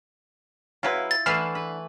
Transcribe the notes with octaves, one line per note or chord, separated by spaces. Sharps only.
C#3 F#3 E4 F4 B4
A6
D3 E3 A3 B4 B5 F6 C7 E7
B4